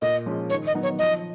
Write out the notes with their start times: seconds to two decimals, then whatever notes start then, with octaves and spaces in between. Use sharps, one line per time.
0.02 A#2 D#5
0.26 F3 G#3 C#4
0.50 D#3 C#5
0.67 D#5
0.74 F#3 B3 D#4
0.83 C#5
0.99 F3 D#5